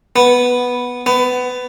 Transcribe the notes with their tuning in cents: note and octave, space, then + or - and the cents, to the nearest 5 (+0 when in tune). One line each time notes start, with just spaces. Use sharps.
B3 -5
B3 +20